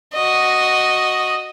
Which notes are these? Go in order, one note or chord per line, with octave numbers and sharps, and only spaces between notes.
F#4 D#5